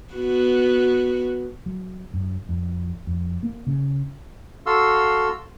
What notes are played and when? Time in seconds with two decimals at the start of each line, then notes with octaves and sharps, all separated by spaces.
0.14 B3 F#4
1.66 F#3
2.14 F#2
2.49 F2
3.07 F2
3.43 A#3
3.67 C#3
4.66 F#4 A4 F5 C6 E6